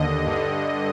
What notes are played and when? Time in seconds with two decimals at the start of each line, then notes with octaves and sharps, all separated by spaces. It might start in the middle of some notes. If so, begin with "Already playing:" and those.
Already playing: D#2 D3 D#5
0.26 G2 D3